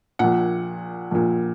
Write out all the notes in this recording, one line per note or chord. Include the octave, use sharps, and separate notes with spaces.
A#1 A#2 F#5
A#1 A#2